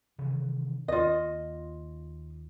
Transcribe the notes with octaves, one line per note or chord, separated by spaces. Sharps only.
C3 D#3 E3
D#2 F4 D#5